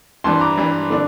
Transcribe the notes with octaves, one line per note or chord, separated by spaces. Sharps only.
G2 E3 G3 A5 C6
A#5 D6
G2 E3 G3
D3 A3 D4